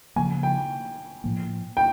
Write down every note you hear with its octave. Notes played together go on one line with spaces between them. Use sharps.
C#3 F3 A#3 G#5
G5
A2 F3 A#3
G5